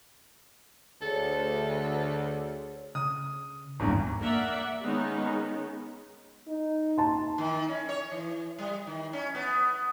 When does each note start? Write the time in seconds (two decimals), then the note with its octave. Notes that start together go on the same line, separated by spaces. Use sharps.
1.02 D2 G#4 A4 C#5
2.95 C#3 D#6
3.80 G#1 E2 G2 A#5 C#6
4.20 A#3 D5 E5 F#5
4.83 D#3 G#3 B3 C#4 D#4
6.47 D#4
6.98 A5 C6
7.38 D#3
7.69 C#4
7.89 C#5
8.11 E3
8.59 G3
8.87 D#3
9.13 C#4
9.35 B3